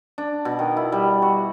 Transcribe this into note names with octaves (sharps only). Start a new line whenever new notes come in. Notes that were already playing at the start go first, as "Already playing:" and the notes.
D4
B2
D#3
E4
G3
F#4